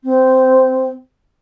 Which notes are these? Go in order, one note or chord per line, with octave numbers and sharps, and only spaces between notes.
C4